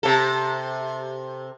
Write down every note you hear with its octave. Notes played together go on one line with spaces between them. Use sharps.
C3 A4